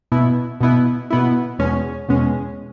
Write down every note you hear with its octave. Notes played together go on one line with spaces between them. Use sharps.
B2 B3 E4
B2 B3 E4
B2 B3 E4
E2 B2 G#3 C#4
E2 B2 G#3 C#4